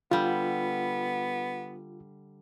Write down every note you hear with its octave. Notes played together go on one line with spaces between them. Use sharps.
D3 G3 B3 F4